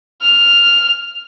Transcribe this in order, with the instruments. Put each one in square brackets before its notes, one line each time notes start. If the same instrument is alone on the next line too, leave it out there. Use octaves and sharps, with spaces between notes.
[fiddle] F6